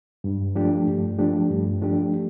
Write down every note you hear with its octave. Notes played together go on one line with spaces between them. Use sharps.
G2
F3 A3 D4 G4
G2
F3 A3 D4 G4
G2
F3 A3 D4 G4